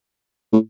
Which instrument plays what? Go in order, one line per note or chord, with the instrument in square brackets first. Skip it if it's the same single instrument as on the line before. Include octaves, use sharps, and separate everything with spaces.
[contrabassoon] A2